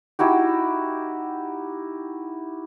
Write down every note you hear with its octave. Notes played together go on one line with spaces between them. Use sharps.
D#4 E4 F#4 G4